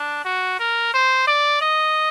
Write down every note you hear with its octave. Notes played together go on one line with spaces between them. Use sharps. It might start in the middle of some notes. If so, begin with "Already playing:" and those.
Already playing: D4
F#4
A#4
C5
D5
D#5